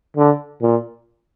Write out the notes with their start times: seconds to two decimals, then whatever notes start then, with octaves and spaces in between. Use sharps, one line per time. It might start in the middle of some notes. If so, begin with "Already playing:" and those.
0.17 D3
0.62 A#2